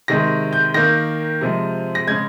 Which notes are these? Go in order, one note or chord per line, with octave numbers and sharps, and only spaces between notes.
C3 D#3 G#3 A#6
G6
D#3 A#3 A#6
C3 F3 G#3
A#6
C#3 G#3 G#6